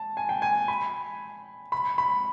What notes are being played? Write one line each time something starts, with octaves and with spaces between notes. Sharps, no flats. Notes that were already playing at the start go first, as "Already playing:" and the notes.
Already playing: A5
G#5
G5
G#5
B5
B5
B5